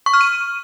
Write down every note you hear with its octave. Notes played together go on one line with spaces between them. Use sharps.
C#6
F6
D#7